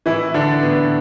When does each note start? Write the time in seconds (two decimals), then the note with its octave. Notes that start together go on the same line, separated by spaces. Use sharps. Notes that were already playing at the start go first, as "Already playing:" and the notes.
0.06 A2 E3 E4
0.34 D3 E3 D4
0.63 A2 B3